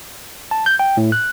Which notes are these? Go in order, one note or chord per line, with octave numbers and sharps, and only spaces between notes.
A5
G6
G5
A2
F#6